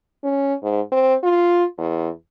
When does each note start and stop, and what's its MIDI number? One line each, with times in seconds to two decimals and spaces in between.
0.24 0.54 61
0.63 0.81 44
0.92 1.15 60
1.23 1.65 65
1.78 2.09 40